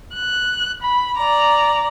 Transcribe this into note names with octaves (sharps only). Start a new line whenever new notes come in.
F#6
B5
D5 A#5